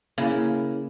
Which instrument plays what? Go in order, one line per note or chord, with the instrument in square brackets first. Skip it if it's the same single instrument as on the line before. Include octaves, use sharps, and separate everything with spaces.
[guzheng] C#3 [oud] A#3 E4